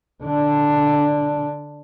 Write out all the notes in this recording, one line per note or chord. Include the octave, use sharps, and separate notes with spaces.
D3 D4